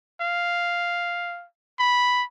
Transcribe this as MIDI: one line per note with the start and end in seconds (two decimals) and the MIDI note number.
0.21 1.46 77
1.79 2.24 83